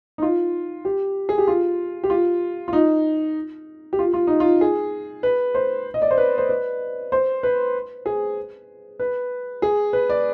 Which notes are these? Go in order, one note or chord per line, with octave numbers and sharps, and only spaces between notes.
D#4
F4
G4
G#4
G4
F4
G4
F4
F4
D#4
G4
F4
F4
D#4
F4
G#4
B4
C5
D#5
D5
C5
B4
C5
B4
C5
B4
G#4
B4
G#4
B4
D5